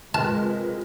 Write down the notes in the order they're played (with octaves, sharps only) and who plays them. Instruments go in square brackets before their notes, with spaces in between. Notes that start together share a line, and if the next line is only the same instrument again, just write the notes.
[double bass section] C3 G#3 [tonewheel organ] F4 A#4 B4 [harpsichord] A5